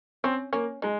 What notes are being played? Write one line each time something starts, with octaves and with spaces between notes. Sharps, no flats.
C4 C#4
A#3 C#4
G#3 D#4